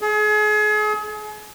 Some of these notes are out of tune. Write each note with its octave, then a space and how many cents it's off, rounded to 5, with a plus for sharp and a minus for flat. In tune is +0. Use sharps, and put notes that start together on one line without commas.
G#4 +35